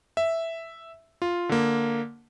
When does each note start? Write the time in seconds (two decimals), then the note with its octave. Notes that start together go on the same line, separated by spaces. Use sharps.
0.17 E5
1.22 F4
1.49 D3 A#3